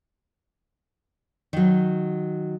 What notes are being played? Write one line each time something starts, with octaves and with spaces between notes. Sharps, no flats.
D#3 F#3